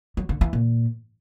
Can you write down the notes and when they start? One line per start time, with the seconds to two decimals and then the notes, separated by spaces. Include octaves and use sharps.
0.17 F#3
0.29 D3
0.41 E3
0.53 A#2